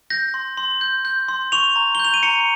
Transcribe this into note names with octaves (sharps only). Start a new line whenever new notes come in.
G6 A#6
C6
C6
G6
G6
C6
C#6 F7
A#5
G7
G6
F7
D#7
A#5 C#7